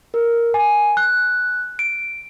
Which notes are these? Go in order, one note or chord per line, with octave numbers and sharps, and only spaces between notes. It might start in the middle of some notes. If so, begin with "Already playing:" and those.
A#4
G#5
F#6
D7